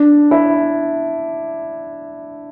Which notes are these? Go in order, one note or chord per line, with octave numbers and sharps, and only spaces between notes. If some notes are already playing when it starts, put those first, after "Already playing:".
Already playing: D4
E4